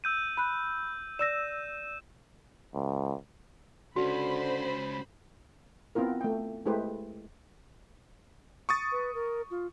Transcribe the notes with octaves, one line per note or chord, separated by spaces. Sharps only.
E6 G6 D#7
B5 F#6
D5 E6 A#6 E7
C#2
C#2 D3 C#4 F#4 C5 B5
B3 C4 E4 F4 A#4
A3 G5
G#3 A3 E4 G4 B4 C5
C#6 D#6 A6
B4
A#4
F4